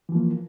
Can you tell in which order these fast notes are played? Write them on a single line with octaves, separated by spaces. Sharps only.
E3 F3 A#3